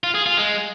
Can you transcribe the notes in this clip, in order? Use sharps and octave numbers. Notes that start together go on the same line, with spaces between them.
F4
G#4
F4
G#3